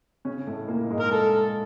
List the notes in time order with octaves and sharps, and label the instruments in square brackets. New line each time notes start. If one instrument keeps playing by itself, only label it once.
[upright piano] C#3 C#4
A2 A3
A#2 A#3
G#2 G#3
[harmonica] A#4
A4